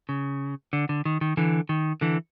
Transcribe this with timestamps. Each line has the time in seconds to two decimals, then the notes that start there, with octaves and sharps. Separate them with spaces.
0.09 C#3
0.73 D3
0.89 D3
1.05 D#3
1.21 D#3
1.37 D3 E3
1.69 D#3
2.01 D3 E3